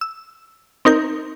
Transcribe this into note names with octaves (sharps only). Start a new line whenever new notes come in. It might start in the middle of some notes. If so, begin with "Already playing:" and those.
E6
C4 D#4 A#4 G6